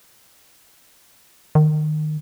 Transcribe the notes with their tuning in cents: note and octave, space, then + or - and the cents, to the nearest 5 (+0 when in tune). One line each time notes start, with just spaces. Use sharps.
D#3 -25